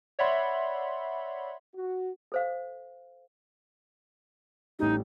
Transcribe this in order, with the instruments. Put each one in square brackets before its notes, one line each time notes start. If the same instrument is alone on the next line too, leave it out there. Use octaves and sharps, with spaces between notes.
[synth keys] C#5 D5 E5 F#5 B5 C6
[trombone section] F#4
[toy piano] A4 C5 F5
[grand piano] A1 G3 [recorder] D#4